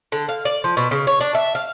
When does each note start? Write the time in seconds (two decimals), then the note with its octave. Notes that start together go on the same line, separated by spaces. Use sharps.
0.12 D3
0.29 F5
0.45 D5
0.64 F3
0.77 B2
0.91 C#3
1.07 C#5
1.21 D4
1.35 E5
1.55 F5